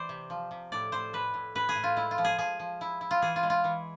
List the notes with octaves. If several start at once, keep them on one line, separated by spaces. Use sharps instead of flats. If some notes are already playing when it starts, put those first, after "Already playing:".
Already playing: E3 C5 D5
C3
F3
C3
A2 D5
A2 C5
A2 B4
A2
A2 B4
G#4
A2
F4
G#3 E4
F4
F3
G#4
F3 G#4
F3
E4
E4
F4
E3 G#4
F4
G#3
F4
E3